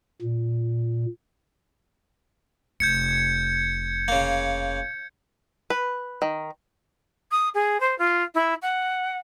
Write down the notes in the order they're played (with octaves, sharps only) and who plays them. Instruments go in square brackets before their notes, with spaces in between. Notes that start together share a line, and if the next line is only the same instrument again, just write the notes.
[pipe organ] A#2
[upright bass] F1 [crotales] G6 G#6 C#7
[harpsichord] C#3 A#3
[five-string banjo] B4
D#3
[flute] D#6
G#4
C5
F4
E4
F#5